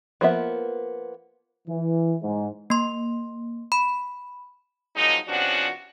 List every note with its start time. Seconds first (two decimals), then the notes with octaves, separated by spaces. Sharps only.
0.21 F3 A#3 B3 E5
1.67 E3
2.22 G#2
2.70 A#3 C6
3.72 B5
4.96 F3 F#3 G#3 A#3 D#4
5.28 C3 F3 B3 C#4 D4 F#4